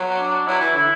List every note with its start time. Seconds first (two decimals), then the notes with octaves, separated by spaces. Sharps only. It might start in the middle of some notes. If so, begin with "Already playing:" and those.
Already playing: F#3
0.19 D4
0.47 F#3 E4
0.60 E3
0.74 D3 E4